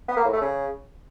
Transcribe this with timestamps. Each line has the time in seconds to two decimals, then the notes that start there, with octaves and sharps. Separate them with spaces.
0.08 B3
0.16 A#3
0.25 A2
0.33 A3
0.41 C#3